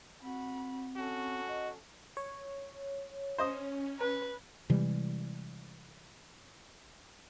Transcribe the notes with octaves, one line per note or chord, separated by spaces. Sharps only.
C4 F#4 B5
C#4 F#4 A4
D#5
C#5
C#4 C5 D#5 D#6
B4
C3 E3 G3 G#3